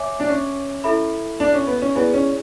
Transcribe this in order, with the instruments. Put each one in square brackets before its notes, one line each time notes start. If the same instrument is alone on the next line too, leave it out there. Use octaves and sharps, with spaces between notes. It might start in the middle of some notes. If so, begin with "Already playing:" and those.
Already playing: [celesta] C#5 E5 G#5 D6
[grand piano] D4
C#4
[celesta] E4 A4 E5 B5
[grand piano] D4
C#4
B3
C#4
[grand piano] B3 [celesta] E4 G#4 D5 G#5
[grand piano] C#4